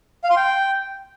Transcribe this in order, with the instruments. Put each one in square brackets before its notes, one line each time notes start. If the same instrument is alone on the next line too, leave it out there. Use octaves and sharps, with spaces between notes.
[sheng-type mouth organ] F5
C6
G5